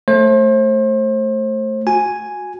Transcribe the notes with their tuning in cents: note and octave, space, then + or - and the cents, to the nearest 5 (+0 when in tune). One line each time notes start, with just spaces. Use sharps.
A3 +0 C5 +35
F#4 -15 G#5 +0